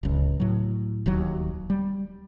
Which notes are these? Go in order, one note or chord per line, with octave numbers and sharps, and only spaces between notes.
D1 C#2
A2 F#3
D1 D#2 F#3
G3